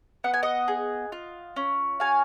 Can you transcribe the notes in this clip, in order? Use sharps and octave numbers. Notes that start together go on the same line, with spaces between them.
B3 F#5
G#5
D#5 F#5
G#4
F4
C#4
F#4 F5 G#5